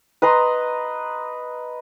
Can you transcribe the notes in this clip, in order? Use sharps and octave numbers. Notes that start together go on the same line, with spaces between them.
B4 D#5 A#5 C6